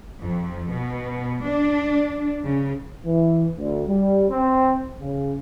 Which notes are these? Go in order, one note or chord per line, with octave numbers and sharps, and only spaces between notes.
F2
B2
D4
C#3
E3
D2
G3
C4
C#3